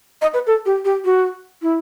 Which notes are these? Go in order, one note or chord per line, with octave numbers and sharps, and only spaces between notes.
D#5
B4
A4
G4
G4
F#4
E4